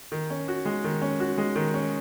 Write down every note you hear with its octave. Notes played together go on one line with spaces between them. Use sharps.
D#3
C#4
F#4
G#3
D#3
C#4
F#4
G#3
D#3
C#4